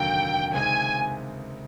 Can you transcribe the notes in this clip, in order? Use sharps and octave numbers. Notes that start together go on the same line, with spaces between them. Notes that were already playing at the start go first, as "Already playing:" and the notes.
Already playing: F1 D#2 D3 F#3 A#3 G5
C#2 C3 D#3 G#3 G#5